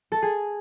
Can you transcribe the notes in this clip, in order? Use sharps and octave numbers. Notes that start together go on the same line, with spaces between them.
A4
G#4